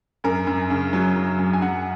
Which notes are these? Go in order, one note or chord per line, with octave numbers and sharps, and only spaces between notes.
F#2 A#4
F#2
C#3
F#3
F#2
F#2
G#5
F#2 F#5